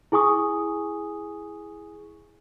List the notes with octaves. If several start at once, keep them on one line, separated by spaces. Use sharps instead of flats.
E4 G#4 G#5 C#6 D#6